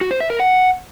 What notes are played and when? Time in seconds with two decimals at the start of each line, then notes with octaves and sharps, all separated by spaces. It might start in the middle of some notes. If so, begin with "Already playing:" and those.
0.01 F#4
0.11 C5
0.20 E5
0.30 A#4
0.40 F#5